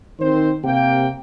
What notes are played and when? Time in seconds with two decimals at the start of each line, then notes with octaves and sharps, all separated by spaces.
0.20 D#3 C4 C5
0.64 C3 A#3 G5